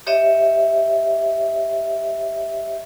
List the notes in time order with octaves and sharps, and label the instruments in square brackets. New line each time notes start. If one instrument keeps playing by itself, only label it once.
[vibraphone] G4 C#5 D#5 E5